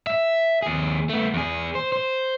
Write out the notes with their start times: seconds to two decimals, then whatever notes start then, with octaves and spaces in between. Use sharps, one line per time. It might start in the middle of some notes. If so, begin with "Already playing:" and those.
0.07 E5
0.62 D#2 G#4
1.09 A3 B3
1.34 E2 G#4
1.75 C5
1.92 C5